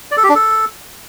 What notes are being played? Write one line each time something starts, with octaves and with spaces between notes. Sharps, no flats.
D5
A4
G4
D4
A4